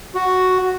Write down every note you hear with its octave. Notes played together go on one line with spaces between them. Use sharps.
F#4